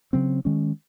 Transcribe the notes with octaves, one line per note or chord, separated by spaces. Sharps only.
C#3 F#3 C4
D#3 G#3 C#4